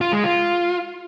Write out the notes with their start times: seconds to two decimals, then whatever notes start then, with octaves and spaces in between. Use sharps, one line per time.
0.01 F4
0.13 G#3
0.24 F4